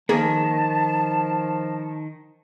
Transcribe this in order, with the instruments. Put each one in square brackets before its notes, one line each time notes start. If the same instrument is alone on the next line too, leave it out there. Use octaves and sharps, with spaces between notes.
[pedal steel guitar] D#3 [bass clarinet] F3 [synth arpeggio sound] A#3 G#4 [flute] A5